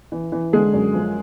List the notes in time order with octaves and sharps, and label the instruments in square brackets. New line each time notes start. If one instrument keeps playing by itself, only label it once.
[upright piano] E3
E3
D3 G#3 G#4
F#2
F3